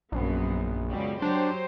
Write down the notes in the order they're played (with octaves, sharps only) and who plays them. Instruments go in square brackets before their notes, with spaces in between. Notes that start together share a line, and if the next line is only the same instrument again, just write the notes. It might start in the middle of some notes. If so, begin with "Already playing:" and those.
[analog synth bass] A#1 [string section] F#2 B3
[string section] C#2 B2 G3
[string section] F#3 G4 C5 [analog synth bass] D4